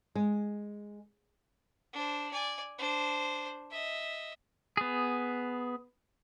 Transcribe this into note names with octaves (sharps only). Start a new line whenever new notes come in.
G#3
D4 C5
D5 G#5
D4 C5
D#5 E5
B3 G#4